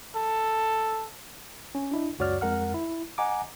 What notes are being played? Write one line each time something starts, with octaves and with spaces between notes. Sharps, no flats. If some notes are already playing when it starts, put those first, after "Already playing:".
A4
C#4
D4 E4 D#5
C#2 F#2 F#4 C#5 D5 F6
F2 G#3 A#4 F#5 F6
E4
D#5 F#5 G#5 A#5 D6